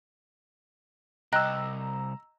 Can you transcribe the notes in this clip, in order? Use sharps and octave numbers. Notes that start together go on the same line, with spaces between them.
C2 D#5 G5 A#5 E6 F#6